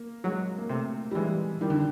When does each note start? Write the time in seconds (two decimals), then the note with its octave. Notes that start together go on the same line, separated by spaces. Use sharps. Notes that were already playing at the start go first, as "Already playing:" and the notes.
Already playing: A#3
0.24 F#3 G#3
0.58 A#3
0.69 C3 A3
1.11 G3
1.15 E3 G#3
1.61 D#3 G3
1.70 D3